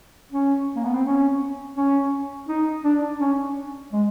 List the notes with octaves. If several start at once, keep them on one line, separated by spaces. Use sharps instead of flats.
C#4
A#3
B3
C4
C#4
C#4
D#4
D4
C#4
G#3